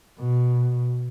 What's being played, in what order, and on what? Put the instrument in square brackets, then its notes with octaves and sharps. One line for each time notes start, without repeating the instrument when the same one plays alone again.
[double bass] B2